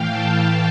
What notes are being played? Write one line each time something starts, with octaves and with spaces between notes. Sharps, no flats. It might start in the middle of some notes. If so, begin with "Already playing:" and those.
Already playing: A2 E3 F5 G5
A5